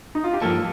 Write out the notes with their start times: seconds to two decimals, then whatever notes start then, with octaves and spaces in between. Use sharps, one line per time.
0.15 D#4
0.24 F4
0.33 G4
0.42 G2 F3 A#3 A4